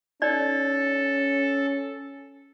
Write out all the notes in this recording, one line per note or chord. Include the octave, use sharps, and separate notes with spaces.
C#4 D#4 A4 C#5 D5